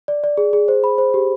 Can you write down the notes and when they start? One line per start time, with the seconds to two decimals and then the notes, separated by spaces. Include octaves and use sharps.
0.08 D5
0.24 D5
0.38 G#4
0.53 G#4
0.68 C5
0.84 B5
0.98 C5
1.14 G4